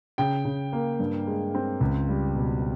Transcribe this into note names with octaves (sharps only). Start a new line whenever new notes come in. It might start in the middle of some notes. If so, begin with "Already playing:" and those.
C#3 G5
C#3
A#3
G2
G#3
C4
C#2
G3
B2